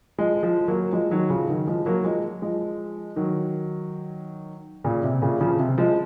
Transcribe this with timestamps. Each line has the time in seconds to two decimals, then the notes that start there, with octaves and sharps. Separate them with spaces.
0.18 F3 G#3
0.43 F3 G#3
0.68 F#3 A#3
0.93 F3 G#3
1.11 D#3 F#3
1.30 C#3 F3
1.49 D#3 F#3
1.67 F3 G#3
1.86 F#3 A#3
2.04 F3 G#3
2.42 F3 G#3
3.16 D#3 F#3
4.84 A#2 C#3
5.04 C3
5.22 A#2 C#3
5.41 C#3 F3
5.59 C3
5.78 F3 G#3